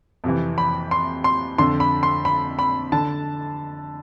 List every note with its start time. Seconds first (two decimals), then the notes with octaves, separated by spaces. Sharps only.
0.24 F2 C3 E3
0.58 B5
0.91 C6
1.24 C6
1.58 F2 D3 C6
1.80 B5
2.03 C6
2.25 B5
2.59 B5
2.92 D3 A5